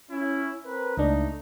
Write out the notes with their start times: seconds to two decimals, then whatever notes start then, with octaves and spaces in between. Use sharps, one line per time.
0.11 C#4 E4
0.66 C4 A#4 B4
0.97 C#2 A3 D4 D#4